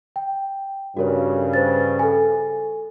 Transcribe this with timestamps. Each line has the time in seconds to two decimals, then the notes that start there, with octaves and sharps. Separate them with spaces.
0.16 G5
0.97 G2 C#3 F#4 A#4 C#5
1.54 B4 C5 A6
1.99 A4 G#5